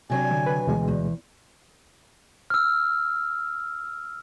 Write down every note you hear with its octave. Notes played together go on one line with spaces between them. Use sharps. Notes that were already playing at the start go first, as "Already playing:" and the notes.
C3 F#3 D4 G#5
D3
B4
D2 B2 E3 G#3
E2
E6 F6